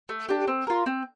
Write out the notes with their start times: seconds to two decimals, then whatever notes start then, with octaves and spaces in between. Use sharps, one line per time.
0.09 A3
0.29 D4 G4
0.48 C4
0.67 F4 A#4
0.86 C4